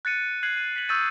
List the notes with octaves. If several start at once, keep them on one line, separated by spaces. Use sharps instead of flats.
F#6 A6 C#7 D#7
F#6 G#6 C7 F#7
C7 D#7
B6 F#7
C#6 D#6 E6 G6 A6 D#7